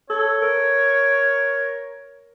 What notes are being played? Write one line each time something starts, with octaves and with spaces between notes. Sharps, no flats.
A4 C#5
A#4